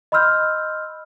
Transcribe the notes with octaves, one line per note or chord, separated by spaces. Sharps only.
D#5 B5 C6 E6 F6 G6